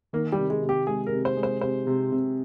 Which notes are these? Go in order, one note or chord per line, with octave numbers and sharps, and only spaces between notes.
D#3 A#3
G3
C3
G#3
C3
G4
G#3 G#4
A#4
C3
C5
G#3
C5
C3 C5
C3
C3